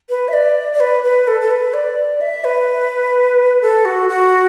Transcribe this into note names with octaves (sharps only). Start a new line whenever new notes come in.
B4
E5
D5
D5
B4
B4
A4
A4
B4
D5
E5
B4
A4
F#4
F#4